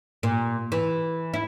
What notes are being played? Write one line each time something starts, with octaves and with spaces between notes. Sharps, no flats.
A#2
E3
E4